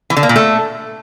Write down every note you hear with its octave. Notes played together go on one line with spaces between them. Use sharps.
E3
D3
A#3
A#2
A3